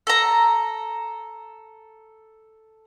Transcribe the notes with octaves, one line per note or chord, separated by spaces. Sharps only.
A4 A#5